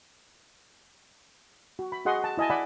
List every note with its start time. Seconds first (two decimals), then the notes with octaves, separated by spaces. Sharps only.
1.79 F#4
1.92 B5
2.05 F#4 G#4 D#5 F#5 C6 D#6
2.24 A5
2.38 E4 D#5 G#5 A5
2.50 D5 F#5 G#5 B5